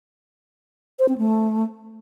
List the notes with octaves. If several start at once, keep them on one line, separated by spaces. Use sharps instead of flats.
C5
C4
A3